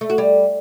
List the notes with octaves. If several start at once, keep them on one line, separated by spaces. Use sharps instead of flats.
A3
F#4
G3